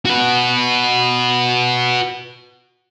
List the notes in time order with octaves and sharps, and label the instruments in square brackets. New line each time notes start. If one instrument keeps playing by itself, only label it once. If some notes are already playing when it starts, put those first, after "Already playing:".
[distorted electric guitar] F#4 B4